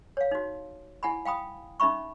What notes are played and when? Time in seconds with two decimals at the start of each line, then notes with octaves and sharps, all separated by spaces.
0.17 C#5 F5
0.31 D#4 F#4
1.03 E4 F#5 G#5 B5
1.25 F5 G5 B5 D#6
1.80 C#4 D#4 E5 B5 C#6